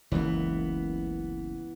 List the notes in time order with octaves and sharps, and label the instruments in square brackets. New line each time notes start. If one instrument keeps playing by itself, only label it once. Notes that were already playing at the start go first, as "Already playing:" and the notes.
[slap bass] F#1 C#2 F#2 [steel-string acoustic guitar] E3 B3